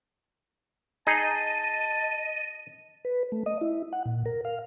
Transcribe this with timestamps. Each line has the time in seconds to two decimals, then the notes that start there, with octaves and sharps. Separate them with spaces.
1.07 D#4 G#4 D#5 A5 D#7
3.05 B4
3.32 A3
3.46 D#5
3.61 E4
3.93 F#5
4.06 A#2
4.26 A#4
4.45 F5